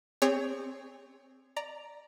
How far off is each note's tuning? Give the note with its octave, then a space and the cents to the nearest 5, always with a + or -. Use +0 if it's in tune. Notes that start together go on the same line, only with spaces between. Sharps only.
C4 +0 G#4 -40 C#5 +10
D5 +0 A#5 +0